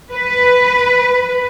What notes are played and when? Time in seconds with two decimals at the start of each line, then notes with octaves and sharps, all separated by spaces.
0.12 B4